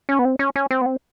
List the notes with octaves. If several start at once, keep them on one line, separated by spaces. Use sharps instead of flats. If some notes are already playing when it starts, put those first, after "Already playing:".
C#4
B3
C4
C#4
C#4
C4
B3
C4